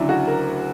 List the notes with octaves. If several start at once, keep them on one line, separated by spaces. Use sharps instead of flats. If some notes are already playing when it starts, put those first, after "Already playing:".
Already playing: D2 C#3 F#3 D4 E4
F#4
A#4